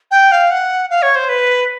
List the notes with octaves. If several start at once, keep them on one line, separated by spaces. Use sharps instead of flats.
G5
F5
F#5
F5
C#5
C5
B4